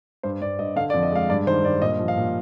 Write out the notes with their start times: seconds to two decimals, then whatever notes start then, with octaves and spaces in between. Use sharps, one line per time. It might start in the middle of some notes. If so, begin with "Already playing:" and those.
0.23 G2 C5
0.41 G2 D5
0.59 G2 D#5
0.76 D3 F5
0.90 D5
0.94 F2
1.03 D#5
1.12 G#3 F5
1.30 G2 D5
1.47 D#3 C5
1.64 G2 D5
1.82 A#2 D#5
1.99 F3
2.08 F5
2.17 A#2